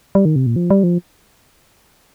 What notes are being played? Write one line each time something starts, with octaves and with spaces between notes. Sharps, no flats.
G3
D#3
C3
A#2
F3
G3
F3